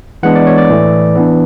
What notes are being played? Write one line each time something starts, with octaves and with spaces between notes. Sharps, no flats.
E3 G#3 B3 D4 F#5
D5
C#5
D5
A2 E3 A3
E3 B3 D4